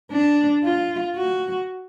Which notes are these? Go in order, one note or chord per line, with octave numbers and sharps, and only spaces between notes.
D4
F4
F#4